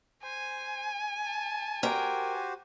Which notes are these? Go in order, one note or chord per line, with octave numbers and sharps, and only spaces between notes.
C5 G#5
A5
F#4 G4 A#4 C5 G5